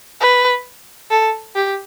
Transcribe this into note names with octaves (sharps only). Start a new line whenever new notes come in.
B4
A4
G4